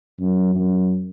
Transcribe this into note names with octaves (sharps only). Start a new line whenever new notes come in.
F#2
F#2